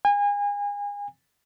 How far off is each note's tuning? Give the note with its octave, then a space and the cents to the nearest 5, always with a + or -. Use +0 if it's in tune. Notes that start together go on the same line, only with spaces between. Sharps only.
G#5 -30